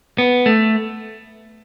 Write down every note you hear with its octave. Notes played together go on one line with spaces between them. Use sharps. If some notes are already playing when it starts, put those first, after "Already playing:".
B3
A3